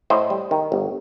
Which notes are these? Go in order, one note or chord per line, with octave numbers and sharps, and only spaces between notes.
A2 C5 D#5
G3
D#3
G1